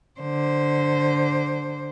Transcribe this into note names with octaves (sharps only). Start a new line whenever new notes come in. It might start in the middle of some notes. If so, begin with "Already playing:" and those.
D3 C5